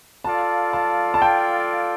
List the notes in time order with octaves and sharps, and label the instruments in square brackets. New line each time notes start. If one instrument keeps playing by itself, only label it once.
[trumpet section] F4 A4 D5 F5 [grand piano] A5
[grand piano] A5
A5
G5